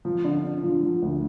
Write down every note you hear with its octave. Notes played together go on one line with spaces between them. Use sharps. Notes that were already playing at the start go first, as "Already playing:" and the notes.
F3
D3
D3
F3
F3
D2